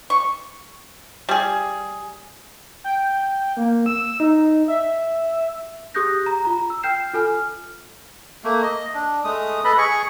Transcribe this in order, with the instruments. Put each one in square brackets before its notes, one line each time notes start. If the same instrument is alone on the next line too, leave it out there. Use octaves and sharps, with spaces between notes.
[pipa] C#6
G3 G#4
[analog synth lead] G5
A#3
E6
D#4
E5
[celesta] G4 G#4 D#6 F#6 G6 A#6
A#5
F4 A#5
E6
G5 F6 G6 C7 E7
F4 A4 G#5 F6
[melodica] A3 A#3
D#5
D4
G#3 A3 D#6
A4 B4 D#5 B5
G#4 C#6